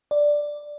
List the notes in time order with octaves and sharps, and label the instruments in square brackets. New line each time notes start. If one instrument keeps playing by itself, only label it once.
[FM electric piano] D5